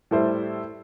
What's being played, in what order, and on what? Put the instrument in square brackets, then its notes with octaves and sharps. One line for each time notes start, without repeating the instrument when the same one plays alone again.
[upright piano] A2 G3 E4 A4 C5